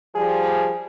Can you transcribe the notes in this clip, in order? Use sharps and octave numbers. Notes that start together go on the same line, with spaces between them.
F3 G3 G#4